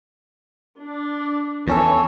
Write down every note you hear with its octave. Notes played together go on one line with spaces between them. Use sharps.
D4
E2 E3 C#4 A4 C#5